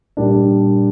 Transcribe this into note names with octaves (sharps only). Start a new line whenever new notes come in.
A#2 G3 A#3 D4